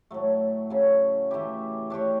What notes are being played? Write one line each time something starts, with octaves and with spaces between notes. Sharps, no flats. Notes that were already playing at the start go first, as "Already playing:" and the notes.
A2 F#3 A3
C#3 F#3 C#4
E3 A3 E4 G4
A3 D4 G4 C#5